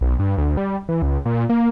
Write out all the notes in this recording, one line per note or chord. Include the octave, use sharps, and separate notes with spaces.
B1
G2
D2
G3
E3
C#2
A#2
A#3